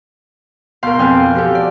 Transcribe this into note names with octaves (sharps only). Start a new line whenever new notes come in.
B2 A#4 F5 C6 G6
F2 B4 F5 G5 G#5
F3 F#4 G4 A4
D5